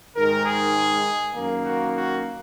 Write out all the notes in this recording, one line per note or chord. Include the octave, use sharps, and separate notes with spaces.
G#2 D#3 G#3 A#4
G#4
F#2 D#3 A#3
F#4
F#4